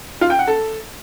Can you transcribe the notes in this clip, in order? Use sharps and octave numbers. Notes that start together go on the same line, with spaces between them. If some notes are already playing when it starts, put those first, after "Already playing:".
F4
G5
F#5
A4